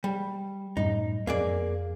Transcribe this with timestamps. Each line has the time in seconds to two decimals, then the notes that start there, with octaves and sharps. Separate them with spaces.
0.04 G3
0.77 F#2 A2 G3 D#4
1.27 F2 A#3 G#4 D5